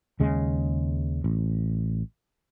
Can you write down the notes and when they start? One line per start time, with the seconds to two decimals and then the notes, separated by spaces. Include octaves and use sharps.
0.20 D#2 C#3 G#3
1.24 A1